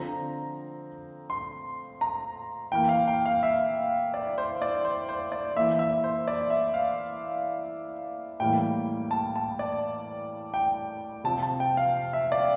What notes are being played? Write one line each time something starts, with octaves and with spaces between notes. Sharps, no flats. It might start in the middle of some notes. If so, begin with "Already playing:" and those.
Already playing: D3 F3 C4 A#5
C6
A#5
E3 A#3 G5
F5
G5
F5
E5
D5
C5
D5
C5
C5
D5
E3 A#3 E5
E5
C5
D5
E5
F5
A2 E3 G3 A#3 G5
A5
A5
D5
G5
C3 F3 C4 A5
A5
G5
F5
E5
D5